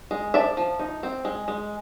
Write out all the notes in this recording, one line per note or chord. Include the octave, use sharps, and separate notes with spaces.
G#3
F3 D5 E5
F3
D#4
C4
G#3
G#3